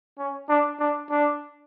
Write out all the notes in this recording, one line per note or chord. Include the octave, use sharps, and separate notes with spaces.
C#4
D4
D4
D4